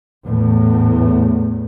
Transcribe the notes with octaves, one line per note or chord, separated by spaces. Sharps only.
E2 A2